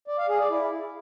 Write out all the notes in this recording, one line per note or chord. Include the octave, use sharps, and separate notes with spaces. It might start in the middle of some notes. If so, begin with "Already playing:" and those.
D5
F5
G#4
D5
E4